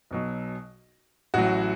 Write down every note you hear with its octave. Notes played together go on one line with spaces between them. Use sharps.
B1 B2 F#3
A1 A2 F#3 F#4